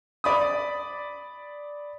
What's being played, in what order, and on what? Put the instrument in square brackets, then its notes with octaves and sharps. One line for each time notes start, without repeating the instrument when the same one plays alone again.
[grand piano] D5 B5 D#6